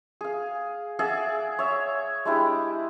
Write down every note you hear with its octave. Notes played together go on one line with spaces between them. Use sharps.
G#4 F5
G#4 D5 E5 F#5
C#5 E5
G#3 D4 E4 G4